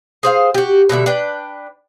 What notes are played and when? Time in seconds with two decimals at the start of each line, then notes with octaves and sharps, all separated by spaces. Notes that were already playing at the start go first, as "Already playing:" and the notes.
0.23 G#4 C5 F5
0.54 F#4 G4
0.89 B2 D3 G3 E5
1.06 D4 B4 G5